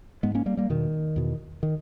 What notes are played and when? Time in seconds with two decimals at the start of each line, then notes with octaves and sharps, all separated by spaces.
0.23 G#2 G#3 B3
0.35 A#3 C#4
0.46 G3 A#3
0.57 G3 A#3
0.69 E2 B2 D#3
1.16 E2 B2
1.63 D#3